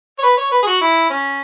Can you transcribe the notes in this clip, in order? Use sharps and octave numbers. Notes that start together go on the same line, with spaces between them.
C#5
B4
C#5
B4
G#4
F#4
E4
C#4